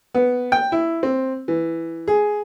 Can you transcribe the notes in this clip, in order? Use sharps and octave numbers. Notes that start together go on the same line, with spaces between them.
B3
G5
E4
C4
E3
G#4